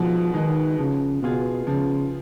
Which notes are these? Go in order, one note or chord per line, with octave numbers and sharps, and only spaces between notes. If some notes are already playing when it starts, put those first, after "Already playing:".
Already playing: B2 F3 G#3 B3 D#4
D#3 G#3 B3 D#4
C#3 F3
B2 B3 F4 G#4
C#3 F3